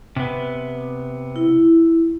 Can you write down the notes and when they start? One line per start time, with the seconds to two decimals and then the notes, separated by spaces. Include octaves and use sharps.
0.16 C3 B3
1.36 E4